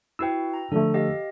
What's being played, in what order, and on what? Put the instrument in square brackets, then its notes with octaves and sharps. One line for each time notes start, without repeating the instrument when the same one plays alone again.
[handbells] E4 F#4 B4 [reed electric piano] G5 E6
[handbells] A#5
[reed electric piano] D3 F3 A3 [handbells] A4
[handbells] G4 D#5 F5